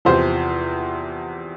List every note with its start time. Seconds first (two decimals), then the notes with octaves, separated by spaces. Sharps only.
0.05 E2 C3 F3 C5